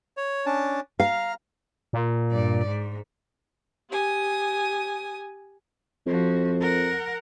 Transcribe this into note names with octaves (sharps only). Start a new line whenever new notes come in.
C#5
C#4 D4 A5
F5 A#5 F6
A#2
G2 D5
G#2
G4 G#5 D#6
F2 F3 F#4
A#4 F#5